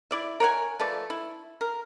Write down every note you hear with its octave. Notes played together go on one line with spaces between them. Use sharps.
E4 D5 E5
A#4 C#5 F#5 G#5
F3 A3 B4 D5
E4
A#4